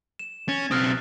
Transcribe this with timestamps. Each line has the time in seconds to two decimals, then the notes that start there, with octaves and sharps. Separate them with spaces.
0.19 E7
0.49 C#4 A6
0.71 B1 C4 D#6 F6 F#6